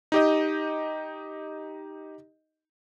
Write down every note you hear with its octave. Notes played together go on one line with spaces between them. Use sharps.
D#4 G4 D#5